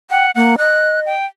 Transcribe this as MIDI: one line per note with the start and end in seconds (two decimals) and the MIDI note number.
0.10 0.31 78
0.10 0.27 79
0.35 0.56 58
0.35 0.54 78
0.58 1.10 75
0.58 1.00 90
1.06 1.26 79